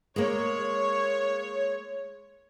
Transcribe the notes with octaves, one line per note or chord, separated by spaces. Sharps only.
G#3 A#3 C#5